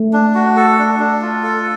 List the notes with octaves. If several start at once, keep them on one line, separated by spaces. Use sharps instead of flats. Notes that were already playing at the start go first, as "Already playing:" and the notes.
Already playing: A3
D4
F#4
A4
D4
D4
F4
A4